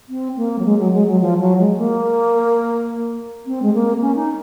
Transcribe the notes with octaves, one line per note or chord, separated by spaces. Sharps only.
C4
A#3
F#3
G#3
F#3
G#3
F#3
F3
F#3
G#3
A#3
C4
G#3
A#3
C#4
D#4